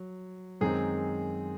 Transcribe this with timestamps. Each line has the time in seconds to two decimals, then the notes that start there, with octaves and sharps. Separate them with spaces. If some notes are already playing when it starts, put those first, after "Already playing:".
Already playing: F#3
0.61 F#2 D#3 G#3 C4 D#4 G#4